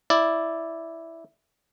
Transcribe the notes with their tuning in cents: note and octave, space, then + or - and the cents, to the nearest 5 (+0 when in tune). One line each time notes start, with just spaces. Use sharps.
E4 +0 D5 +0